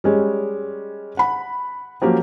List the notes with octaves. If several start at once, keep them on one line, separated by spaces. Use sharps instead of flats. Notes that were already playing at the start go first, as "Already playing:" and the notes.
G3 G#3 C#4
F#5 B5
F3 F#3 A#3 C#4 G4